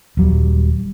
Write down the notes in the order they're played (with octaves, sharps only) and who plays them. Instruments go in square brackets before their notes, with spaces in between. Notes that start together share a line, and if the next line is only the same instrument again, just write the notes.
[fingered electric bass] D#1 F#3 G3